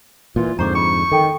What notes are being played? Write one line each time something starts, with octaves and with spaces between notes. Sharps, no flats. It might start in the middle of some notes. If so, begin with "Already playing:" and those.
A#2 E3 F4
F2 G#2 D3 C5 A#5 C#6 D6
B5 C#6
D#3 A4 G5 A5